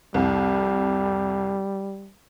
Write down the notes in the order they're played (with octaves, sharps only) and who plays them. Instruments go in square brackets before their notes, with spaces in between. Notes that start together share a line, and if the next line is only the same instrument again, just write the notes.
[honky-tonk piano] C2 F2 [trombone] G3